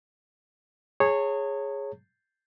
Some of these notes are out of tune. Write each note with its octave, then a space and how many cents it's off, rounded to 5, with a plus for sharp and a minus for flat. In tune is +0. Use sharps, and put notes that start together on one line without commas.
G#4 +0 C#5 -10 A#5 -45